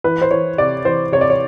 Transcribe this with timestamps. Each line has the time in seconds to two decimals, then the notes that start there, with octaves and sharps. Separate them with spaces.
0.04 E3 B4
0.22 C5
0.31 E3 C#5
0.58 C3 D5
0.85 E3 C5
1.12 C3 C#5
1.21 D5
1.30 C#5